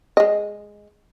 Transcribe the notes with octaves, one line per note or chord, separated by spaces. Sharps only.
G#3 D#5